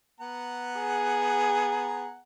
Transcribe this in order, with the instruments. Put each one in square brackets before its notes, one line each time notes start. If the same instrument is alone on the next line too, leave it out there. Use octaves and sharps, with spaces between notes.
[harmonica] B3 F#5 A#5
[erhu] G#4